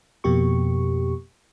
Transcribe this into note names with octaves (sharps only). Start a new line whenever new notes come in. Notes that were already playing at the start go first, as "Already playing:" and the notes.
F2 B2 A#3 G4 C#6